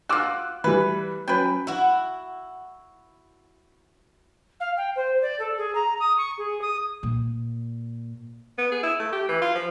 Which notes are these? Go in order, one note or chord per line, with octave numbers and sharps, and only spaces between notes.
F4 F#4 D6 E6 F#6
E3 G3 B4
F#3 C#4 B4 G5
E4 F#4
F5
G5
C5
D5
A4
G#4
A#5
D#6
C#6
G#4
D#6
A#2
B3
G#4
E4
A3
G4
E3
F4
F3